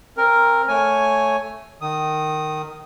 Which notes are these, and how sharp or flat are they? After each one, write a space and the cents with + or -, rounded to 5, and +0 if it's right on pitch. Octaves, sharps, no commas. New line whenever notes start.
C4 +30 A#4 +0
A3 +0 C#5 +0 G#5 +0
D#3 -15 D#6 +0